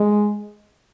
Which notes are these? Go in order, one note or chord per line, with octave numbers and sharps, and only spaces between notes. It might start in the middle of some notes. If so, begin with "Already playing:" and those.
Already playing: G#3